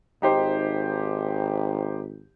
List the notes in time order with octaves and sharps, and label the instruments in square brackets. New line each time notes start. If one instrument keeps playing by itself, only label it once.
[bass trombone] G#1 [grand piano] D#4 G4 C5